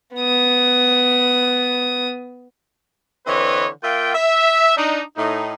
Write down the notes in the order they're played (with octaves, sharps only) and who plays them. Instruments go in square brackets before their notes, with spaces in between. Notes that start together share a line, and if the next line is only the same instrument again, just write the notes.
[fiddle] B3 D#6
[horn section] D3 E3 C4 B4 C#5 D#5
A#3 F4 E5 G5
E5
D4 D#4
A2 D#4